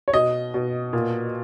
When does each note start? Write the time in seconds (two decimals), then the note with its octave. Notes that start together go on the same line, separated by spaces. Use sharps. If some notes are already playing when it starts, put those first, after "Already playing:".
0.08 C#5
0.14 B2 D#5
0.54 B2
0.93 A#2